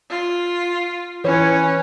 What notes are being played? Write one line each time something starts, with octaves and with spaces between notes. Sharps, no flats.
F4
E3 C#4 B4 C#5